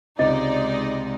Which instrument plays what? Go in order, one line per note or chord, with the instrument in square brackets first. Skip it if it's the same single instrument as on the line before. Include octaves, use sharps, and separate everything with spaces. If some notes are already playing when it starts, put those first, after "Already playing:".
[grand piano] C#2 C3 [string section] G#3 D#4 D5 [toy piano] D#5